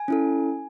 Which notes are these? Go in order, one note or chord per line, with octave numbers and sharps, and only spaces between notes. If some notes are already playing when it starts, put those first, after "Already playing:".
Already playing: G#5
C#4 E4 A4